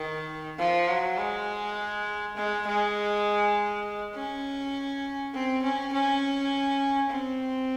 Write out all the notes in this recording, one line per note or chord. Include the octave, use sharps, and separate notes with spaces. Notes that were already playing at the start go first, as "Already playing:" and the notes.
Already playing: D#3
F3
F#3
G#3
G#3
G#3
C#4
C4
C#4
C#4
C4